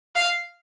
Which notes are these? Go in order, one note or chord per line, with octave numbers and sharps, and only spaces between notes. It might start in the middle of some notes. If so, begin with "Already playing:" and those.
F5